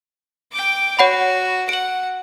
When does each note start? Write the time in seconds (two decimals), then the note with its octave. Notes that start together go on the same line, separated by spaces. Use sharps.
0.52 G5 D6
0.99 F#4 C#5 F#5 B5
1.69 F#5 D7 F#7